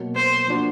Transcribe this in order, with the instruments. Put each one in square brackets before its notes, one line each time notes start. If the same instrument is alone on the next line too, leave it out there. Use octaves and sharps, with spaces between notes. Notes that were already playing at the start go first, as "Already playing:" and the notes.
Already playing: [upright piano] B2 F#3 A#3
[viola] C5
[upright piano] F3 A#3 D4 F#4